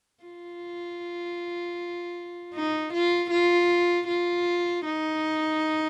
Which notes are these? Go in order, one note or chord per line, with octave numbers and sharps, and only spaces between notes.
F4
D#4
F4
F4
F4
D#4